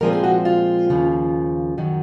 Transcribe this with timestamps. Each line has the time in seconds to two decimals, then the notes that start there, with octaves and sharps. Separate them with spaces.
0.01 A#2 F3 G#3 C4 A#4
0.13 G#4
0.24 F#4
0.45 F4
0.90 D#2 C#3 F3
1.78 F#2 D#3 F#3